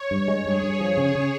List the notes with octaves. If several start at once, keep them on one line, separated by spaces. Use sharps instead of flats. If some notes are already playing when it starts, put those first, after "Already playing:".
Already playing: C#5
G2
G#3
G2 G#4
G2
F3
C#3
C#3